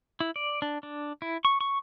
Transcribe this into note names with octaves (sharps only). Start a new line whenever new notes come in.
E4
D5
D4
D4
E4
C#6
C#6